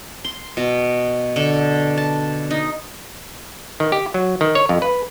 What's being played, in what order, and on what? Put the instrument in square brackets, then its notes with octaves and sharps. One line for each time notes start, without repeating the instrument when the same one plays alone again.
[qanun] C6
B2
D3
A5
D#4
[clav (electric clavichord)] D#3
G4
F#3
D#3
C#5
F2
B4